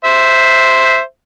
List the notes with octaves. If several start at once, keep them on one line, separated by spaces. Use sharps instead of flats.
C5 E5